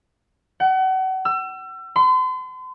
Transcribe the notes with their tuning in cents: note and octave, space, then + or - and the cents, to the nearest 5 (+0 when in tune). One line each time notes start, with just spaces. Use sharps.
F#5 +35
E6 +35
C6 -40